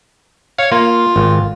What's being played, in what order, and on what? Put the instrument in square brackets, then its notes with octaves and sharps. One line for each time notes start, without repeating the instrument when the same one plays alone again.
[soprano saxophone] C#5 [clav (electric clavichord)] F5
[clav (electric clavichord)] A#3 [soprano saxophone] F4
[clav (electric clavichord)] G#1